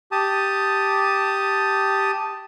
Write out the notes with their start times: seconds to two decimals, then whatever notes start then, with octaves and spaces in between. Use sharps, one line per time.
0.12 G4 A5 D#6